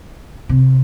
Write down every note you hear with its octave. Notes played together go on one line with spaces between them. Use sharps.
C3